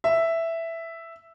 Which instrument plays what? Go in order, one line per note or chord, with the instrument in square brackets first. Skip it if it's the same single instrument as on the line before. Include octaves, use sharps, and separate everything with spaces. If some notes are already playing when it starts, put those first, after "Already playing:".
[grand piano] E5